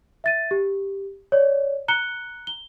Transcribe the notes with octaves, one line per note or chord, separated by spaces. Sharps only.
E5 A6 D#7
G4
C#5 D5
A#5 F#6 C#7 G7
G7